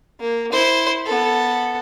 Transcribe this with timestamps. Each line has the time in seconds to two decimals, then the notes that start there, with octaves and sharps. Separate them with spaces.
0.20 A#3
0.52 E4 C5
1.06 B3 A4